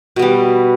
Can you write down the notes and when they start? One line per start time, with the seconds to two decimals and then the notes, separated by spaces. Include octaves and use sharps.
0.16 B2
0.19 B3
0.22 G3